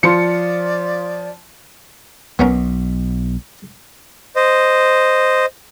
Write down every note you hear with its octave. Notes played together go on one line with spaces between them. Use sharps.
F3 F4 D5 C6 C#7
B1 B2 B3 C#4 A#4
C5 D#5